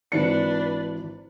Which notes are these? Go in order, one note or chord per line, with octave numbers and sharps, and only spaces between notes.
G#1 E3 D4 B4 C#7